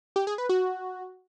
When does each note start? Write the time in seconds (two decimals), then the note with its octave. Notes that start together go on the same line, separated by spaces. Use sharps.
0.16 G4
0.27 G#4
0.38 B4
0.49 F#4